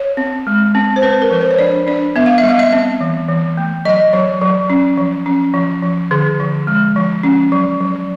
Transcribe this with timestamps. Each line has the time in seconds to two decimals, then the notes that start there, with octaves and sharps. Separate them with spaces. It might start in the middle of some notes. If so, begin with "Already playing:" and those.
Already playing: C#5
0.17 C4
0.47 G#3
0.75 C4
0.96 C5
1.02 C4 B4
1.22 A#4
1.31 F3 B4
1.41 C5
1.51 C#5
1.59 D4 D5
1.87 D4 D5
2.16 B3 E5
2.26 F5
2.38 E5
2.43 G3
2.49 F5
2.59 E5
2.73 C4 E5
3.01 E3
3.29 E3
3.57 A3
3.85 F#3 D#5
4.13 F#3 C#5
4.41 F#3
4.70 C#4
4.97 F3
5.26 C#4
5.54 F3
5.82 F3
6.11 D3 G#4
6.40 F3
6.67 G#3
6.96 F3
7.23 C#4
7.52 F#3
7.80 F#3